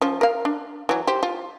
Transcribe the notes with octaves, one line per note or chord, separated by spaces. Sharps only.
F3 C#4
A#4 F5
D4
E3 F#3
G4 C5
F4